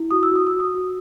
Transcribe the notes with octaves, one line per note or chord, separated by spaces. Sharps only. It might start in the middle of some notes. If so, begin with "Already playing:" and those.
Already playing: E4
F#4 D#6
E6
F#4 D#6
E6
F#4
D#6
F#4